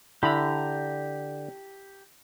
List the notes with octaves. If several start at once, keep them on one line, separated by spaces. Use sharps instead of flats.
D3 E4 G4 A#5 B5